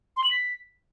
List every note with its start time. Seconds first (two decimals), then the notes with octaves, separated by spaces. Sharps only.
0.17 C6
0.24 F#7
0.31 B6